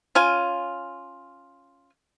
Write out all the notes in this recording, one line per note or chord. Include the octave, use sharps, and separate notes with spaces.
C#4 F4 G#5